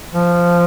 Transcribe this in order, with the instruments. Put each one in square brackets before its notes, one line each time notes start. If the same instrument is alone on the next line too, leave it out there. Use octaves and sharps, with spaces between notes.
[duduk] F3